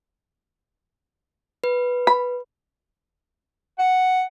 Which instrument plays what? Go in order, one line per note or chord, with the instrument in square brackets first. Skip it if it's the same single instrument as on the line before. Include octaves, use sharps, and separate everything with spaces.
[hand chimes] B4
[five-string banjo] B5
[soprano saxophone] F#5